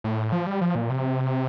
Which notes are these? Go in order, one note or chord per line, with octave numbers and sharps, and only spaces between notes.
A2
F3
G3
F3
A#2
C3